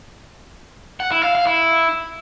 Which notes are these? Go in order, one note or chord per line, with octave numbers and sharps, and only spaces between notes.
F#5
E4
F5
F5
E4